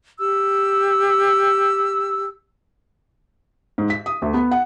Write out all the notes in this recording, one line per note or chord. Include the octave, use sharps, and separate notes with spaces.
G4 E6
G#2
B6
D#6
D2
B3
F#5